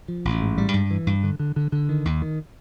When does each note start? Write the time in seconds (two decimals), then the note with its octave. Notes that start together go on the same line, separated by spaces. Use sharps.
0.08 F3
0.25 A1
0.41 G#2
0.58 G3
0.74 G2
0.91 E3
1.07 G2
1.23 D3
1.40 D3
1.56 D3
1.72 D3
1.89 D#3
2.05 D#2
2.22 D#3